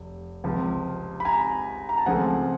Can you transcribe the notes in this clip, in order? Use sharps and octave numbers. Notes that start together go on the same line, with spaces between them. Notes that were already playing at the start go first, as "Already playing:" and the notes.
Already playing: F1
C#2 C3 F3
B5
G#5 A#5
A#5
A5
C#2 C#3 F3 A3 C4 F#5 G#5